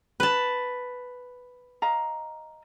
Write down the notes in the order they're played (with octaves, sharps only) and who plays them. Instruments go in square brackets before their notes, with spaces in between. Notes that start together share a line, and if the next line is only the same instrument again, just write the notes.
[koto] B4 A5
[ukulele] D#5 F5 A#5